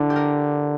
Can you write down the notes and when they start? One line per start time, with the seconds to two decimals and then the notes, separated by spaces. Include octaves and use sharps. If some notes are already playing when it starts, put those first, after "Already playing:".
Already playing: D3 D4 E4
0.10 G4
0.16 A#4